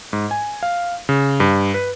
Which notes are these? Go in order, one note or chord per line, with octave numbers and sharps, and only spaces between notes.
G#2
G#5
F5
C#3
G2
B4